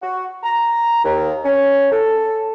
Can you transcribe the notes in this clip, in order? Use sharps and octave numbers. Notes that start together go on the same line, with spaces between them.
F#4
A#5
D#2
C#4
A4